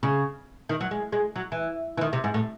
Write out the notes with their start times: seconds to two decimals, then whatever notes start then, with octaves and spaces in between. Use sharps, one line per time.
0.03 C#3
0.69 D#3
0.81 F#3
0.91 G#3
1.12 G#3
1.36 F#3
1.52 E3
1.97 E3
2.01 D#3
2.13 C3
2.24 G#2
2.34 A2